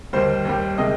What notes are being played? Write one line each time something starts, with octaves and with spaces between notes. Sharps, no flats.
D#2 D#3 G3 C5
D#2 D#3 G3
C3 D#3 G#3 D#5